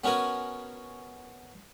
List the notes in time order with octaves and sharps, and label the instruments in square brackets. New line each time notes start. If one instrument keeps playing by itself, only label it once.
[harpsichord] B3 C#4 F#4 A#4 G#5